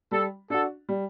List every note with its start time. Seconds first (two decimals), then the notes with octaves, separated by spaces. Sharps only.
0.11 G3 A4
0.50 D4 F#4 A4
0.89 G3